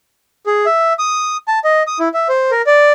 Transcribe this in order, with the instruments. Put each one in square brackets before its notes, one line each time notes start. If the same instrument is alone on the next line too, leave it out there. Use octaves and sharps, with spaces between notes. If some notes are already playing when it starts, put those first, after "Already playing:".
[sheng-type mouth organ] G#4
E5
D#6
A5
D#5
D#6
E4
E5
C5
A#4
D5